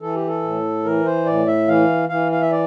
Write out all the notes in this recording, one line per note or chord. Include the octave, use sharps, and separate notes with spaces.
E3 A4
G4
A4
A2
E3 A#4
C5
A2 D5
E5
E3 F5
E3 F5
F5
E5
D5